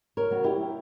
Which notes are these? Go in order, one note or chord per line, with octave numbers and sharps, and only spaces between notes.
A#4 C#5
C#3 F#3 B3
E4 G4